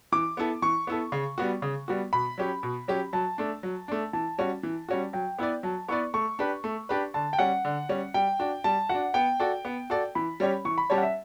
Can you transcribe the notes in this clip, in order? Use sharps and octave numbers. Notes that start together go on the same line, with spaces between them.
E3 D6
B3 E4 A4
E3 C#6
B3 E4 A4
C#3
G3 B3 F#4
C#3
G3 B3 F#4
B2 B5
F#3 C#4 G4
B2
F#3 C#4 G4
F#3 A5
A3 D4
F#3
A3 D4
E3 A5
G3 C#4 F#4
E3
G3 C#4 F#4
F#3 G5
B3 E4 B4 D5
F#3 A5
B3 E4 B4 D5 C#6
A3 C#6
D4 G4 B4
A3
D4 G4 B4
D3 A5
G5
G3 C#4 F#5
D3
G3 C#4
G3 G5
D4 F#4
G3 A5
D4 F#4 F#5
B3 G5
F#4 A4 D5
B3
F#4 A4 D5
E3 B5
G3 C#4 G4 C#5
E3 C#6
B5
G3 C#4 G4 C#5 A5
F#5
E5